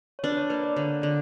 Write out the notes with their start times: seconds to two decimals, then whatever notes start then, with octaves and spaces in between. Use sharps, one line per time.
0.19 C#5
0.23 D4 B4
0.37 C#5
0.50 A#3 B4
0.64 D5
0.76 D3 C#5
1.02 D3 D5